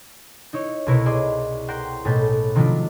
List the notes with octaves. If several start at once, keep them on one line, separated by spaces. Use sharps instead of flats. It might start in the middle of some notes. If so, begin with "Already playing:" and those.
D#4 E4 C#5
C2 B2 E4 A#4 B4 C#5
G#4 C5 D5 D#5
A#4 C5 F#5 G5 C6
B1 A2 B4 G#5 A5 G6
C3 D#3 F3 F#3 B3 D4